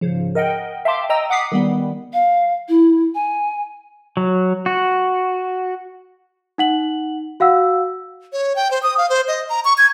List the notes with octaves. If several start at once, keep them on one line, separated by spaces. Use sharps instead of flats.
G#2 C#3 F3
A#4 D#5 F#5 G5
E5 F5 G5 A5 C6 D6
D#5 G5 A#5 E6
F#5 D6 D#6 B6 C7
D#3 G3 B3
F5
E4
G#5
F#3
F#4
D#4 F#5 F#7
F#4 F5 F#5 E6
C#5
G5
C5
D#6
F5
C5
D#5
A#5
C#6
G#6